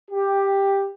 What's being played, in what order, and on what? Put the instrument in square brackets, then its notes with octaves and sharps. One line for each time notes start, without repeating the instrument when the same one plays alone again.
[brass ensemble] G4